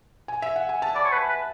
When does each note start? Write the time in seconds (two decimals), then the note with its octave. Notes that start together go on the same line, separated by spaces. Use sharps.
0.28 G#5
0.42 E5
0.56 F#5
0.69 G#5
0.82 A5
0.95 D5 B5
1.04 C#5
1.12 B4
1.29 B4